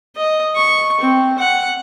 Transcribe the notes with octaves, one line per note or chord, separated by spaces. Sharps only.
D#5
C#6
C4
F#5